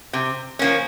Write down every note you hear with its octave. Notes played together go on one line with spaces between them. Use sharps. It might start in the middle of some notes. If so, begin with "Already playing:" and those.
C3
F3 A#3 C#4